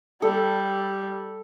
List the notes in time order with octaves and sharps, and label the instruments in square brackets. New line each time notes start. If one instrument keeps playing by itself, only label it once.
[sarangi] G3 [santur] A4